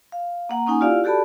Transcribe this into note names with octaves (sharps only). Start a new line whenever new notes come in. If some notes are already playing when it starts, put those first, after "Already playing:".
F5
A#3 F#5 A#5
A#3 C#4 D#4 F#5 G#5
E4 F4 G4 D5 F5
F#4 G4 A4 D5 A5 B5